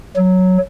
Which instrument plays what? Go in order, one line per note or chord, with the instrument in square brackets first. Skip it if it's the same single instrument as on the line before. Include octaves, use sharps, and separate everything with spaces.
[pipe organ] F#3